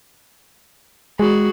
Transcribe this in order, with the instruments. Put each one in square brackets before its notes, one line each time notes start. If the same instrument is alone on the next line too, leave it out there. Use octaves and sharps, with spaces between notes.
[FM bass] G#3 [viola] F#4 G#4